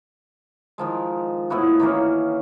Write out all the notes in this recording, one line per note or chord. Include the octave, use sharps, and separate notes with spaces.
D#3 F3 G#3
A2 B3 E4 F#4
D#3 E3 A#3 C#4